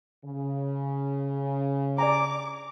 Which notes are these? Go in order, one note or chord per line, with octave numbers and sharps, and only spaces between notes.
C#3
D5 G#5 A#5 D6